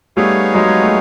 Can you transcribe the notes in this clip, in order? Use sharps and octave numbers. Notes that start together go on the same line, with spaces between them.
G3 A3 B3 D#4 G#4 C#5 F5
F#3 G#3
A3